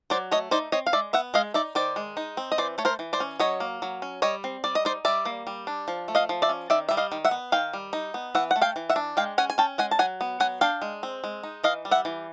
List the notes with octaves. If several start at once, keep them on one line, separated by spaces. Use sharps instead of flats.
F#3 C5 D5
A3 C#5 D#5
D#4 C5 D5
C4 C#5 D#5
F5
G#3 D5 E5
B3 E5 F#5
G#3 D#5 F5
D#4 D5 E5
D#3 C5 D5
G#3
D#4
C4
D#5
E3 C5 D5
A3 C#5
A#4 C5
E3
C5 D5
C#4
F#3 C#5 D#5
A#3
F#3
C#4
G3 C#5 D#5
C4
G3 D5
D#5
D#4 C5 D5
G3 D5 E5
A#3
G3
D4
F3
A3
D#5 F5
F3
D5 E5
C#4
D#3 D5 E5
G3 E5
D#5 F5
D#3
E5 F#5
B3
D#3 F5 G5
G3
D#4
B3
E3 E5 F#5
F#5
A3
F5 G5
E3
E5 F#5
D4
G#3 F5 G5
C#4 F#5 G#5
G#5
C#4 G5 A5
G#3 F#5 G#5
A5
F#3 F#5 G#5
B3
F#3 F#5 G#5
D4 F5 G5
G#3
C4
G#3
D#4
E3 D#5 F5
G3
E5 F#5
E3